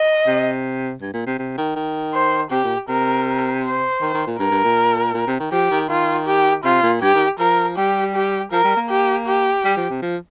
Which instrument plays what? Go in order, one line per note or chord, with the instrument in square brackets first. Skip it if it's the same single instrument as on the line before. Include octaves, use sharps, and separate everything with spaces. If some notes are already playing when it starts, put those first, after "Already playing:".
Already playing: [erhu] D#5
[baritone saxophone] C3
G2
A#2
C3
C3
D#3
D#3
[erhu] C5
[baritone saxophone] C3 [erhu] G4
[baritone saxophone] A#2
[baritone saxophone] C3 [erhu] A#4
[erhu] C5
[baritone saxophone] D#3
D#3
A#2
[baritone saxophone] G2 [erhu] A#4
[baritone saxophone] G2
A#2
A#2
C3
D#3
[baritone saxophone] F3 [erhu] G4
[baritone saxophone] D#3
[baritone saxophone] D#3 [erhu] F4
[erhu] G4
[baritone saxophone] C3 [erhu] F4
[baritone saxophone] A#2
[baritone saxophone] G2 [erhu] G4
[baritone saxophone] D#3
[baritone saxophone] F3 [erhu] A#4
[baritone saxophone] G3 [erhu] G4
[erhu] G4
[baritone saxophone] F3 [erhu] A#4
[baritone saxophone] G3
A#3
[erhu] G4
G4
[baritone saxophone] G3
F3
C3
F3